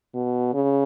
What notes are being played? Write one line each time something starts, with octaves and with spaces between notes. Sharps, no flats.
B2
C#3